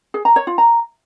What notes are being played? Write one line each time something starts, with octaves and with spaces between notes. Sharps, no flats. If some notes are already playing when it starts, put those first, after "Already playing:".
G#4
A#5
C#5
F4
A#5